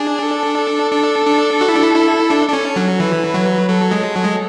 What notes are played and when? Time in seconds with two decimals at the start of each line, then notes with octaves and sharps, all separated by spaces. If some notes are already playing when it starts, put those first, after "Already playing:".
Already playing: D4 G#4
0.22 A4
0.91 D4
1.26 D4
1.61 F#4
1.68 E4
1.75 D4
1.83 E4
1.96 E4
2.30 D4
2.48 D4
2.53 C#4
2.76 F#3
3.00 E3 B4
3.34 F#3
3.69 F#3 A4
3.91 G#3
4.03 A4
4.15 F#3
4.25 G#3